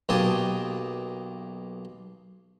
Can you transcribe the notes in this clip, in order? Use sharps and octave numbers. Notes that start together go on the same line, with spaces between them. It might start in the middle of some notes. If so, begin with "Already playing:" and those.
B1 A#3 G4 G#5 A5 D#6